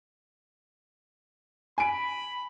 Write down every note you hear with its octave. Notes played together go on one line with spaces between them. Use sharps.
G#5 B5 D7